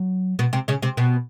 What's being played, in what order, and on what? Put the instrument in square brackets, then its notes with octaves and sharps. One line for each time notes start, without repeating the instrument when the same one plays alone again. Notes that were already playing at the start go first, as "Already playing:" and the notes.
Already playing: [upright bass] F#3
[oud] B2 B3
C3 C4
C#3 C#4
C3 C4
B2 B3